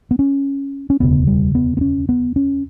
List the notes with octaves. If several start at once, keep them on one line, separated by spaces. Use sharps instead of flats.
B3
C#4
C#4
E1 D2 C#3 B3
G3
B3
B3
C#4
B3
C#4